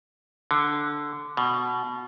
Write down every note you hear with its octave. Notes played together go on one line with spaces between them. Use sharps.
D3
B2